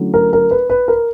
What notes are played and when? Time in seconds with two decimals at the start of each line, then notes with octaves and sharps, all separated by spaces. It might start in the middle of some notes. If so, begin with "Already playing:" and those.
Already playing: D3 F#3 A3 C#4 E4
0.14 A#4
0.33 A#4
0.51 B4
0.70 B4
0.88 A#4